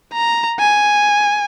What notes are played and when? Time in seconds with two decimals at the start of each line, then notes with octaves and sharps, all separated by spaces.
0.13 A#5
0.59 G#5